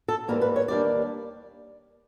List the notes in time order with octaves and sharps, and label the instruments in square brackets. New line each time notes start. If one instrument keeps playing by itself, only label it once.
[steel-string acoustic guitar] A4
G#2 E3 G3 A#3 A#4
B4
C#5
D#2 D3 G3 A#3 D4 D5